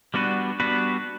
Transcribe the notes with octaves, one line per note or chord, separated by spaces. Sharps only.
G3 B3 D4 F#4 B4
G3 B3 D4 F#4 B4